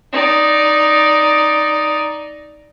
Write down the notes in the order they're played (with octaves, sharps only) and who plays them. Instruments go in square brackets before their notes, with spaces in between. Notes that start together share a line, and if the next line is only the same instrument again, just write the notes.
[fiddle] D#4 D5